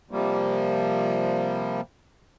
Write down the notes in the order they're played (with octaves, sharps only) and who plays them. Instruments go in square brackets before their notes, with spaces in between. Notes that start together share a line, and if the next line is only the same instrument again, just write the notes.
[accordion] C3 F3 G3 A#3